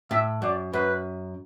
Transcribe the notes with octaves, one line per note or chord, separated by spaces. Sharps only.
A2 E5
F#2 D5
F#2 B4